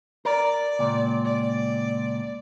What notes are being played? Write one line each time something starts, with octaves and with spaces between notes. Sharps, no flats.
A#4 D5
C#2 A#2
D5